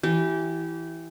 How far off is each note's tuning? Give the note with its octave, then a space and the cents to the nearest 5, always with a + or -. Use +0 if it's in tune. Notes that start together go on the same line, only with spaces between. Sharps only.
E3 +0 G4 -25